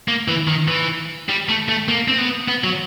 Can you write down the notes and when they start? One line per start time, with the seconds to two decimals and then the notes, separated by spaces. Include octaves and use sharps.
0.08 A#3
0.28 E3
0.48 D#3
0.68 E3
1.29 G3
1.49 A3
1.68 A3
1.88 A#3
2.08 C4
2.18 B3
2.48 B3
2.64 F#3